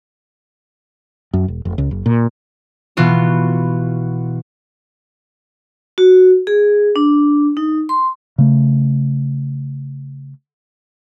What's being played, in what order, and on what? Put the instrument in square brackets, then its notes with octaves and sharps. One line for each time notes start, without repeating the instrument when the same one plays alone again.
[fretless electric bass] F#2
E1
F1
C#2
F#1
A#2
[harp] B2 E3 B3 F4 F#4
[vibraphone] F#4
G#4
D4
D#4
C6
[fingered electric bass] C#3 A3